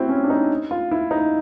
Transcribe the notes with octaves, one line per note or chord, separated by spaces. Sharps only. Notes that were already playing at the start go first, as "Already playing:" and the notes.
Already playing: C4 E4 F#4
C#4
D4
D#4
F4
E4
D#4